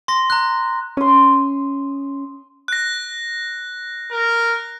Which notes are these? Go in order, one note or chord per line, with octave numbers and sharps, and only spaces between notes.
C6 A#6
A#5 F#6
C#4 C6 D#6
F#6 A#6
A#4